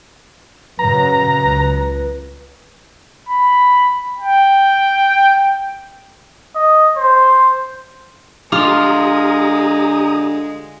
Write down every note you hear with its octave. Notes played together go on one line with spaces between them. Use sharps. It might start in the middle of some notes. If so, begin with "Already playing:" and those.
F#2 C#3 B4 A#5
C#2
B5
G5
D#5
C5
D3 G#3 F4 G4 A#5 D#6